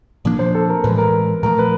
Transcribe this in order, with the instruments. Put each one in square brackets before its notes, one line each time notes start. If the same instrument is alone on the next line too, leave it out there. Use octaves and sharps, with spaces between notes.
[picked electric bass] A#2 F3 A#3 D4
[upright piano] C5
A4
A#4
[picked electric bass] A2 E3 G#3 [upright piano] B4
[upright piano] A#4
[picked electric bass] A#2 F3 A3 [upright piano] A#4
[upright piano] B4